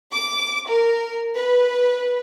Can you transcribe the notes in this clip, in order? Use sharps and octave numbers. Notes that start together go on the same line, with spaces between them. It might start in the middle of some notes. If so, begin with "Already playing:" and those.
D6
A#4
B4